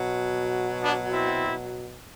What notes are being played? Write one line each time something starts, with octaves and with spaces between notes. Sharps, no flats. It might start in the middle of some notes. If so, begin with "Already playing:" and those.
Already playing: B2 F#3
B3 D4
C4 E4